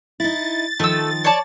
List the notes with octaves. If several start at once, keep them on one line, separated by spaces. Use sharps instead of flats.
D#4 E4 A6
D#3 F3 A3 E6
C#5 D5 A5